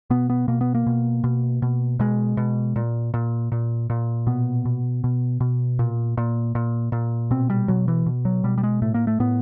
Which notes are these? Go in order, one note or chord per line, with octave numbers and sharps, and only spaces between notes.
B2 B3
B3
B2 A#3
B3
A#3
B2
B2
B2
B2 G#3
B2
A#2
A#2
A#2
A#2
B2 B3
B2
B2
B2
A#2
A#2
A#2
A#2
B2 C4
G3
B2 F#3
E3
B2
F#3
B2 G3
G3
G#3
A2 A3
A#3
A3
A2 B3